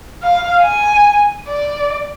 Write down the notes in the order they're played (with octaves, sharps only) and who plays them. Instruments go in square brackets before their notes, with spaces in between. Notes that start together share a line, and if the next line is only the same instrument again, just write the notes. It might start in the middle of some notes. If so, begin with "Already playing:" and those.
[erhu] F5
G#5
D5